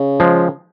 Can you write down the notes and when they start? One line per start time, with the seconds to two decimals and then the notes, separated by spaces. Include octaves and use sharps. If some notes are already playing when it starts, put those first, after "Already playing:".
Already playing: C#3
0.20 F3 G#3